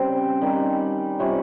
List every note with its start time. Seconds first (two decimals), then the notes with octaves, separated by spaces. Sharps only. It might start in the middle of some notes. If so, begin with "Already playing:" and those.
Already playing: C#3 G3 C4 C5
0.41 D#3 G3 C#4
1.19 C3 G3 C#4 F4 C#5